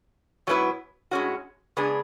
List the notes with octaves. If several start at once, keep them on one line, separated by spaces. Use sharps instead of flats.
G#2 F#3 B3 E4 B4
A2 G#3 C#4 F#4
C#3 G#3 B3 D4 G#4